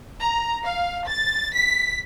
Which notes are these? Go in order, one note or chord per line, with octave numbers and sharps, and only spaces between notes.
A#5
F5
A6
B6